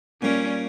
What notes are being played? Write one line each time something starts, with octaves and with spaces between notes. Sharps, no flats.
A#2 G3 A#3 C#4